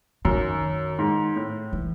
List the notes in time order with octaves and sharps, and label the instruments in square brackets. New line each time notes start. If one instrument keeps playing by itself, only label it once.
[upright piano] F#2 [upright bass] D#3
[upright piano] G#2
A2
[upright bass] E3